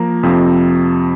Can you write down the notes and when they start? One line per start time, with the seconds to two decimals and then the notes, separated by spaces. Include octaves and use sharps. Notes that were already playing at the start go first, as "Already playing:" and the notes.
Already playing: F3 A#3 A#5
0.23 F2 C3 F3 C4